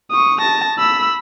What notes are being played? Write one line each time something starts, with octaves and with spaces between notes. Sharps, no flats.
C#6 D#6
A5 A#6
B5 E6